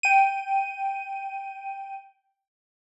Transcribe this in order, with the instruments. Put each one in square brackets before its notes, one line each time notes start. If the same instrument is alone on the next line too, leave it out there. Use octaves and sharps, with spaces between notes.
[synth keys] G5 D#7